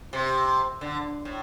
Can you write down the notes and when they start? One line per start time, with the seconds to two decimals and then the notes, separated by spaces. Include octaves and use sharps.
0.13 C3
0.81 D3
1.25 A2